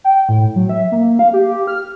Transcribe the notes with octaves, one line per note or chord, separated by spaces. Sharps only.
G5
A2
F#3
E5
A#3
F5
G4
F6